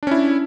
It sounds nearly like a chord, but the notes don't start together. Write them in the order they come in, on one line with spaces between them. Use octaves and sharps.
D4 C#4 E4